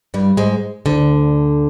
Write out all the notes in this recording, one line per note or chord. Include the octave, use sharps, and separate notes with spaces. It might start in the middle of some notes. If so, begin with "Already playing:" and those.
G2 G3
G#2 G#3
D2 D3